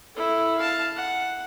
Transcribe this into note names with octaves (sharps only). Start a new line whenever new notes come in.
E4 A4
F5 A5
F#5